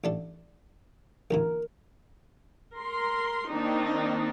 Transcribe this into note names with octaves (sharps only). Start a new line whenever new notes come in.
A1 D4 A4
A1 D2 E3 A#4
A#4 C6
D#3 A#3 C4 D4 D#4